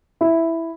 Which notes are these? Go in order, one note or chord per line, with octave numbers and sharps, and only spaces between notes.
E4